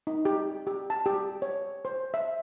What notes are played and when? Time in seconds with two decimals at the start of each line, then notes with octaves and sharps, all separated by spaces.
0.07 D#4
0.25 G4
0.67 G4
0.90 A5
1.06 G4
1.42 C#5
1.85 C5
2.14 E5